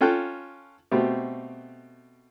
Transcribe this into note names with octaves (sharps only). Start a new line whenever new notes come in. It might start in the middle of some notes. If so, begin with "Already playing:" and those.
C#4 F4 A4 G5 F#6
B2 A3 C4 G4